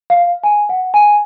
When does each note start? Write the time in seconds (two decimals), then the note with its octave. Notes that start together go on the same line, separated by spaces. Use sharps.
0.10 F5
0.44 G#5
0.69 F#5
0.94 G#5